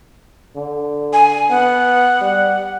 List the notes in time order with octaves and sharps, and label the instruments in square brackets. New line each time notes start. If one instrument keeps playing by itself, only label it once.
[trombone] D3
[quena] G#5
[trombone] B3 [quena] F#5
[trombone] G3